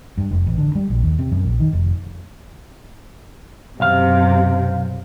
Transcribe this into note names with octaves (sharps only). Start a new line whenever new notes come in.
G2
F1
A1
D3
G3
A#1
D#2
C3
F#2
A#1
D#3
F1
B1 F#2 C3 F5